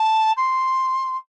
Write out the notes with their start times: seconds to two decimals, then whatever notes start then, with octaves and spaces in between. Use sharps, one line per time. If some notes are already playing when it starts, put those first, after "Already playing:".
Already playing: A5
0.37 C6